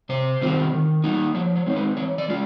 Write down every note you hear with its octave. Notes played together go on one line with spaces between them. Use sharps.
C3 C5
D#3 G3 C4 F4
D#3
G3 A#3 D#4
F3 C#5
C#5
G#3 C4 D#4
B4
E3 C#5
D5
G#3 C#4 F4